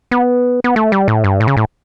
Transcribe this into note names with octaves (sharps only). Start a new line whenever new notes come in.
B3
B3
A3
G3
A2
G2
A2
C#3
A2